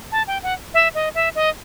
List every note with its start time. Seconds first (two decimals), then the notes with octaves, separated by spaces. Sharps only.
0.12 A5
0.27 G5
0.43 F#5
0.74 E5
0.95 D#5
1.15 E5
1.35 D#5